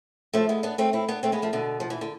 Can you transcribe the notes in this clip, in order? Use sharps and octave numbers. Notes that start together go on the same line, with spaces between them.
F3 A3
G#3 B3
B3 D4
A3 C4
C4 E4
B3 D4
A3 C4
G#3 B3
F3 A3
B2 D3
F3
E3
D3